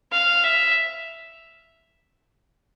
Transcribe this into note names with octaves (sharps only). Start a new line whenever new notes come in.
F5
E5